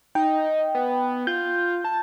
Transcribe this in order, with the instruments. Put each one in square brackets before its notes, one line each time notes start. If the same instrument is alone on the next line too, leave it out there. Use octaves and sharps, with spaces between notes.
[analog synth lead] D#4 [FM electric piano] G5
[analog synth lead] B3
[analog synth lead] F4 [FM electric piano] G6
[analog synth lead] A5